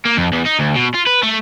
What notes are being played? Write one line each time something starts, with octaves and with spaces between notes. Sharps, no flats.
A#3
F2
E2
D#4
D2
B2
F4
B4
A3